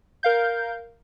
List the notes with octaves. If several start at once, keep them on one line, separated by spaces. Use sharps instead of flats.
A#4 F5 G6